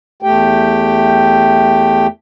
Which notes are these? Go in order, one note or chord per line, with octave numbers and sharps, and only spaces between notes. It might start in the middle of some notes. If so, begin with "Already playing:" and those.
E2 A3 G4 G5